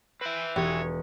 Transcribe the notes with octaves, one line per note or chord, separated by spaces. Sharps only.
C4 B4 E5
E1 G4 C#5